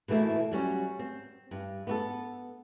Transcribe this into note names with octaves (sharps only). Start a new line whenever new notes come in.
B2 E3 A3 A#3 E4
F#3 G3 C#4
C4
G2
B3 F#4 A4